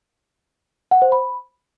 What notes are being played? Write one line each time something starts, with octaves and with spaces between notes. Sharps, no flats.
F#5
C5
B5